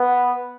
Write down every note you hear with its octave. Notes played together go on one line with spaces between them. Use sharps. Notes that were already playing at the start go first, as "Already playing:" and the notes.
Already playing: B3